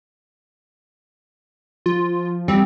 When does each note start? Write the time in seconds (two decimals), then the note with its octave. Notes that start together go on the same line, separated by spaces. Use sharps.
1.86 F3 F4
2.48 G3 C4